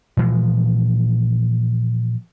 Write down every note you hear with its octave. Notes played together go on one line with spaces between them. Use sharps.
A#2 E3 F3 G#3